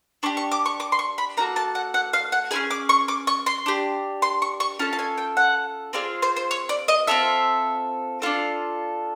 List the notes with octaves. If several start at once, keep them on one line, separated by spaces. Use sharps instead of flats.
D4 G4 C#6
C#6
D6
C#6
D6
C6
C#6
B5
A#3 D#4 F#4 A4 A#5
A5
F#5
F#5
F5
F#5
C#4 E4 G#4 G#5
D6
C#6
D6
C#6
C6
D4 G4
C6
C#6
C#6
C#4 F4 A4 A5
A5
G#5
G5
F#5
C4 F4 G#4 D5
C5
C5
C#5
D5
D#5
C4 F4 A4 E5
D4 F4 A4